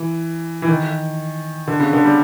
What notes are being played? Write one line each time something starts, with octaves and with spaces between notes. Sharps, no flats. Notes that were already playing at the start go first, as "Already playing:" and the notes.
Already playing: E3
E3
D#3
D3
C#3
D3
G3